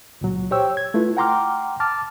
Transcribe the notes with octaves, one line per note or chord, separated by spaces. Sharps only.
C#2 A#2 F#3
G4 C5 C#5 G5 E6
G#6
A3 E4 F4 B4
F#5 G5 A#5 C6 D6 F6
A5 D6 F6 A6